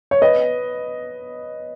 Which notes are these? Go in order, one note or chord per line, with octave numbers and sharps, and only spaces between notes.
C#5
B4 D#5